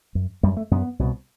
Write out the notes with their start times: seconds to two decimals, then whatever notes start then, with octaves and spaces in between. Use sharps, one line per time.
0.15 F#2
0.43 F#2 G3
0.57 A3
0.71 F#2 B3
0.99 C2 B2